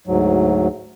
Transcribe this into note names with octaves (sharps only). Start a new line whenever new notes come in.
D2 G#2 F#3